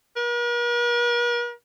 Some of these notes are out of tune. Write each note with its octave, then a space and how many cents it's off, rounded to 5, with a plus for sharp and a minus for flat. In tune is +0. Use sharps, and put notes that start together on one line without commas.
A#4 +45